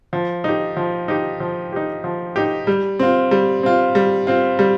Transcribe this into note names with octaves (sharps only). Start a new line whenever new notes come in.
F3
D#4 G4
F3
D#4 G4
F3
D#4 G4
F3
D#4 G4
G3
C4 F4
G3
C4 F4
G3
C4 F4
G3